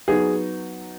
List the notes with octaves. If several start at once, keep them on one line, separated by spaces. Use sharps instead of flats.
F#3 B3 D#4 G#4